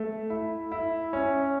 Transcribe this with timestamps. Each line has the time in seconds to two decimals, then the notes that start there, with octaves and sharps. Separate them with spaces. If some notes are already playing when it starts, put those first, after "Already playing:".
Already playing: A3
0.30 E4
0.72 E4
1.13 C#4